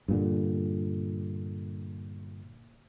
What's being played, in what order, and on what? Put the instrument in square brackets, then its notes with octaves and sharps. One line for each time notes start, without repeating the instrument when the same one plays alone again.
[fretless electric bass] G2 A#2 D3